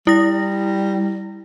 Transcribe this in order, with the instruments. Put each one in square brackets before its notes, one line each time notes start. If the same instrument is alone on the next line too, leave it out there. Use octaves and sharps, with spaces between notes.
[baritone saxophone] G3 [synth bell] E4 A#6